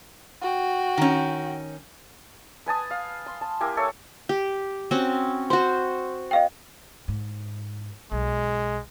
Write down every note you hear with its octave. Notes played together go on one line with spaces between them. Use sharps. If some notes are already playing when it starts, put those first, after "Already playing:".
F#4 G5
D#3 C#4
B4 G#5 A5 D#6
F5
C6
A5
A#3 E4 G4 G#5
A4 C#5 E5 G#5
G4
C4 C#4 F#4
F#4 C5 C6
D#5 F5 G5
G#2
B1 G#3